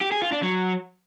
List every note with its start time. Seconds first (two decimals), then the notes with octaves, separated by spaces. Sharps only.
0.01 G4
0.12 G#4
0.22 F4
0.32 D4
0.42 F#3